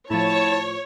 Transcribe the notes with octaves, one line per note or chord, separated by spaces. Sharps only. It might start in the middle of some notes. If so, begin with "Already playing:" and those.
A2 F3 E4 C#5 A5